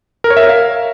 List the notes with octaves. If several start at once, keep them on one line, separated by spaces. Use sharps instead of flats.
A#4
C#5
E5
A#4
F5